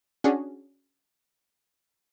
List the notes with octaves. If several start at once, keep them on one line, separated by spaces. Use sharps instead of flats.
C#4 D4 F#4 G#4